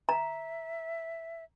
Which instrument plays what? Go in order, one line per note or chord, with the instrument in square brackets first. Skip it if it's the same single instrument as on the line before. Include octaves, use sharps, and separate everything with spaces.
[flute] E5 [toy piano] A#5